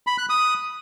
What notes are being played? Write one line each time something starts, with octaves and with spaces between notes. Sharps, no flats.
B5
F#6
D#6